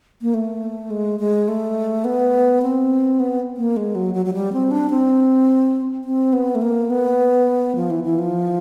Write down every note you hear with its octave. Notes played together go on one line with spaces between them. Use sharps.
A#3
A3
G#3
G#3
A3
B3
C4
B3
A#3
G#3
F#3
F#3
F#3
G3
C4
D4
C4
C4
B3
A3
A#3
B3
F3
E3
E3
F3